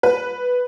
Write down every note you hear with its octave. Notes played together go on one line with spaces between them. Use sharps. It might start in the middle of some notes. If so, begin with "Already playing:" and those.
B4